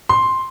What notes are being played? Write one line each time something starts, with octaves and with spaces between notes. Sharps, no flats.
C6